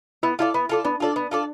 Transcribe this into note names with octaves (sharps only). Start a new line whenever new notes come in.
B3 E4
E4 F4 A4 D5
B3
F4 A4 D5
B3 D4
F4 A4 D5
B3
F4 A4 D5